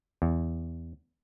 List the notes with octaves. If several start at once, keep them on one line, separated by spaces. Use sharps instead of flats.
E2